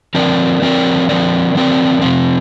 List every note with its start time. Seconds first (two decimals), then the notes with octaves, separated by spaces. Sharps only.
0.15 F3 C4 A#4 D5
0.62 F3 C4 A#4 D5
1.09 F3 C4 A#4 D5
1.55 F3 C4 A#4 D5
2.02 C3 F3 C4